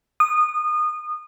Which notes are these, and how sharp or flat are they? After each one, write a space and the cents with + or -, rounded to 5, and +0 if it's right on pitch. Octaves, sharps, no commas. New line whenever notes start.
D#6 -25